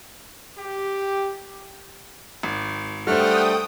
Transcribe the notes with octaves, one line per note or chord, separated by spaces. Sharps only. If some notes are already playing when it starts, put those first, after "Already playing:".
G4
G#1
G3 A3 D4 C5 F#5 G5 D#6 F6